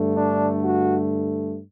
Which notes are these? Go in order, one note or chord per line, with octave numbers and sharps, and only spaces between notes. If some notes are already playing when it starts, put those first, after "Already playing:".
Already playing: G2 D3 A3
D4
F#4